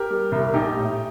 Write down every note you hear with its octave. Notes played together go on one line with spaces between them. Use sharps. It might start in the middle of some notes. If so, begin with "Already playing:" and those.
Already playing: G4 A#4
G3
C2
A#1 D#4 G4
A2